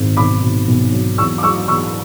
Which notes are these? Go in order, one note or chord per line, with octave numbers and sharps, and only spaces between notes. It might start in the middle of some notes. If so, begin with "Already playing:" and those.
Already playing: G#1
B1 B5 D6
B2
B1
F#3
E2 C#6 E6
D6
F#3 C#6 E6
E2 C#6 E6